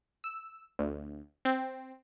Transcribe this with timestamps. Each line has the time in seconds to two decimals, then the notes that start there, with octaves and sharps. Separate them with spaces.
0.24 E6
0.79 D2
1.45 C4